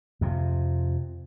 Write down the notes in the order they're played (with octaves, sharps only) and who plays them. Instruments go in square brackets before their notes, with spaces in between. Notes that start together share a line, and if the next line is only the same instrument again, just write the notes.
[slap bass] F2 C3